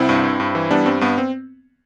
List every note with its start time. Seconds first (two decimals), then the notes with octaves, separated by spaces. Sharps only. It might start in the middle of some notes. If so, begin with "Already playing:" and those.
Already playing: C2 C4 E4
0.09 G2
0.23 G2
0.40 G2
0.55 E3
0.70 G3 B3 D4
0.86 G2 C4
1.01 G2 B3
1.18 C4